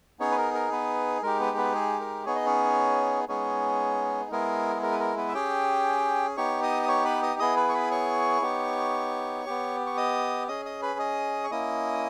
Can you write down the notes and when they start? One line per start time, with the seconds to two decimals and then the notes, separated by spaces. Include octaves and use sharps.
0.20 B3 C#4 D#4 G#4 C#5
0.31 B4
0.38 A#4
0.54 A#4
0.72 B3 B4
1.23 G#3 D#4 G4 A#4
1.40 B3 B4
1.57 B3 B4
1.74 G#4
2.00 A#4
2.25 B3 D#4 G#4 C#5
2.36 D#5
2.46 C#4 C#5
3.28 G#3 B3 C#4 D#4 G#4 C#5
4.31 G#3 B3 E4 G#4 A#4
4.76 G#4
4.82 A#4
4.92 B4
5.00 A#4
5.17 B3 B4
5.28 E5
5.34 C#4 G4 G#4 G5
6.36 B3 D#4 G4 C#5 C#6
6.63 D#5 D#6
6.83 D#6
6.88 C#5 C#6
7.05 B4 B5
7.22 D#5 D#6
7.39 B3 E4 G#4 D#5 D#6
7.57 B4 B5
7.69 C#6
7.74 B4 B5
7.91 C#5 C#6
8.42 B3 D#4 G4
9.46 B3 G4
9.86 C#6
9.97 D#5 D#6
10.48 C#4 G#4 D#5 D#6
10.65 D#5 D#6
10.82 B4 B5
10.99 D#5 D#6
11.44 C#6
11.51 A#3 C#4 E4 D#5 D#6